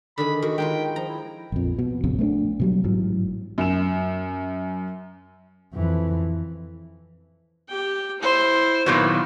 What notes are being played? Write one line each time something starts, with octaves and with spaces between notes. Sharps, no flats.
D3 D#3 G#4 B5
D#3 F#4
G#3 D#4 F4 G5
F3 A#5
E4
A#1 F2
B2
A#1 F2 C#3
A3 A#3 D4
B2 F#3 G3
A1 G#2 E3 F#3
F#2 E7
F2 E3
G4 G5
E4 C5
A#2 D#3 F#3 B3 E4